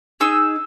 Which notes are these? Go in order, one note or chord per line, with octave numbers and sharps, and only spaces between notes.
D#4 G#4 E6